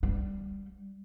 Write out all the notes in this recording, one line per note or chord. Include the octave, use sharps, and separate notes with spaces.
G3